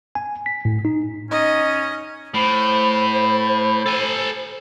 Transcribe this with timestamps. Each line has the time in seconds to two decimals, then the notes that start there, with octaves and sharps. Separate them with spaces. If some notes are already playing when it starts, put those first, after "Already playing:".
0.15 G#5
0.46 B6
0.65 A2
0.85 D#4
1.31 C#4 D#4 D#5
2.34 A2 C5 B5
3.86 A4 G#5